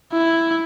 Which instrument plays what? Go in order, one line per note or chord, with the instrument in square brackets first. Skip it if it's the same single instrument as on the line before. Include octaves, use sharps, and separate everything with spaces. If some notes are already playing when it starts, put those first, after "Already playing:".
[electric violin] E4